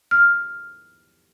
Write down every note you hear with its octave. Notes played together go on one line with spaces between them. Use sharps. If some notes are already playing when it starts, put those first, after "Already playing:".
F6